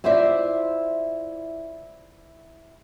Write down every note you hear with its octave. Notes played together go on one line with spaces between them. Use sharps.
E4 F4 C5 D5 E5